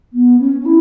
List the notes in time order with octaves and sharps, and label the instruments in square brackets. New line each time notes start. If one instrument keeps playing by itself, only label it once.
[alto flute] B3
C#4
C#4
E4